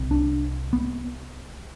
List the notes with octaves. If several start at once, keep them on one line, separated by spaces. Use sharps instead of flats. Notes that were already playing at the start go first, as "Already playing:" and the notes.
Already playing: C2 C3
D4
B3